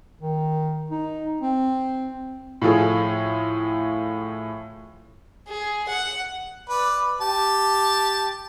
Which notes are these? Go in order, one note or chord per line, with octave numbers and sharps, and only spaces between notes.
D#3
D#4
C4
A2 F3 F4 G#4 A4
G#4
F#5
B4 D5
G4 A5